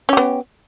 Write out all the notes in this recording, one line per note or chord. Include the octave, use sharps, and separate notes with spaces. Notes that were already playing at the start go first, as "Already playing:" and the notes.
B3 C#4 G4